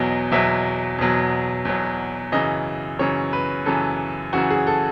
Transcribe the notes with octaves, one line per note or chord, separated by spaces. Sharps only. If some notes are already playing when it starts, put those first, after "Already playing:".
Already playing: E2 B2 F#3 D#5
E2 B2 F#3 E5
E2 B2 F#3
E2 B2 F#3
F#2 C#3 E3 D#5
F#2 C#3 E3 C#5
B4
F#2 C#3 E3 A4
F#2 C#3 E3 F#4
G#4
A4